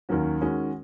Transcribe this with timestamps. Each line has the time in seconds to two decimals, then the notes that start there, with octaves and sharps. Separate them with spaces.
0.09 D#2 D#3 F#3 C#4 F#4
0.41 D#3 G#3 C#4 F#4